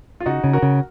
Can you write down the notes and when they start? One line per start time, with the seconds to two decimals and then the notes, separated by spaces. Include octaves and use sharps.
0.20 F4
0.26 C#3 D#4 F#4
0.44 C#3
0.53 F#4 A#4
0.62 C#3